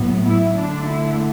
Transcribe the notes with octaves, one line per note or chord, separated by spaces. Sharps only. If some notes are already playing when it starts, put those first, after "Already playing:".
Already playing: A2 F#3 B3
E4
D3 A3 D4
E4